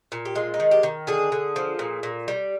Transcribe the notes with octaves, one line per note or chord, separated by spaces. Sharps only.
A#2
G4
G#3 F4
D#4
D#3
G4
D#3
D3 G#4
D3
F3
A#2
A#2
G3